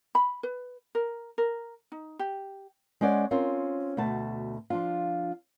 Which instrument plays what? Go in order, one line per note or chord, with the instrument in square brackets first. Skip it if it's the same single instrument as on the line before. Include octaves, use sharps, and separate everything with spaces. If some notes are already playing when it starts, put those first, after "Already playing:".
[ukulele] B5
B4
A#4
A#4
D#4
G4
[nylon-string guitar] G#3 C#4 C5 D5 F#5
C4 C#4 F4 A#4
D2 B2 A3 A5
F3 D4 F4